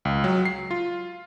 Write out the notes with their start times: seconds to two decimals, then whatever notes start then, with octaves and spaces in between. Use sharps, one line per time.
0.05 C#2
0.24 F#3
0.45 C7
0.71 F4